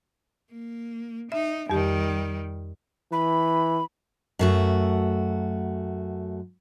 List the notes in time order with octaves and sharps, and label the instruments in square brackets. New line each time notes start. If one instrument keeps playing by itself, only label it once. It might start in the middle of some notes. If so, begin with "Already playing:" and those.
[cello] A#3
[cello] D#4 [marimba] E5
[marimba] F2 G4 [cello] D#3 G3
[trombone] E3 [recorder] B5
[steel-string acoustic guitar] F#2 A3 F#4